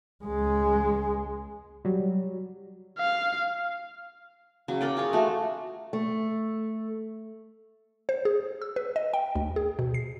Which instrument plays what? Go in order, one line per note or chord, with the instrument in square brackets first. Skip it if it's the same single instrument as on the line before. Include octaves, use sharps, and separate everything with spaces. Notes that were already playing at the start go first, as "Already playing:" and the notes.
[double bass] C#2 G#3
[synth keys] F#3 G3
[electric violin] F5
[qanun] C#3 F#3
A#4 D5 G5
F4 G#4 C#5
A3 F#4
[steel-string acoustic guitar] A3
[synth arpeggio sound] C5
G#4
E6
B4
D#5
G5
D2
G#4
B2
C7